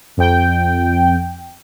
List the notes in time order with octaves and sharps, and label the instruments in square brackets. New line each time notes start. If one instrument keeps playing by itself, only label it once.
[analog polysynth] F2 G5